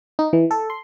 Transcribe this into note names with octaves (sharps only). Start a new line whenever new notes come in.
D#4
E3
A4
C6